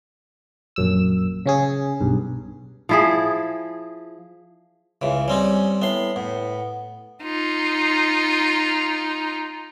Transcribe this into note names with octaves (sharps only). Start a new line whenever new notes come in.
A#1 F#2 E6
C#3 C#4 G#4
B1 G2
F3 E4 G#4
C#2 C#3 E3
G3 C4 C#4 D#4
A2 B3 C6
A2 B3
D#4 F4